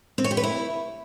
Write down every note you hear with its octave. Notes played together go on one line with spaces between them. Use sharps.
C4
C#5
G4
B4
E4